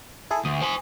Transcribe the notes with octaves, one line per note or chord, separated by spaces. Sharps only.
E4 G#4 A4
D2 D#6
C5 G#5